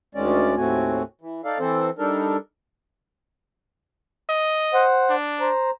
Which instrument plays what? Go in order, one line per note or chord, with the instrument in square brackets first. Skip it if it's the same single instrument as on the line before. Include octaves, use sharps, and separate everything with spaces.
[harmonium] D2 D#3 G#3 C#4 D5
D#2 A2 A3 C4 F#4 G#5
E3
D#4 A4 D5 F5
E3 C4 A4 C5
G3 D4 D#4 A4 A#4
[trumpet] D#5
[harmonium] C5 F#5
[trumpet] D4
[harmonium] C5 A#5